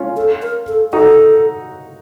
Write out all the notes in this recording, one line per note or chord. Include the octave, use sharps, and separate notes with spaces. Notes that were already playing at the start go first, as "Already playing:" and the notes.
Already playing: C#4 F4
A4
A#4
A4
D#4 F#4 A4